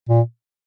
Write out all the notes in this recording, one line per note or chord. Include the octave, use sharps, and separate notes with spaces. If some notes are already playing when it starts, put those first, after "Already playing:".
A#2